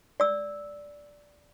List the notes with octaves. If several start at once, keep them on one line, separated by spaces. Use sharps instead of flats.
D5 E6